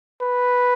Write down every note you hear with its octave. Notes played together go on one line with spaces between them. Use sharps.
B4